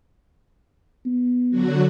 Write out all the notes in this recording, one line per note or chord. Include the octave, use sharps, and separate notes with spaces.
B3
D3 F#3 F#4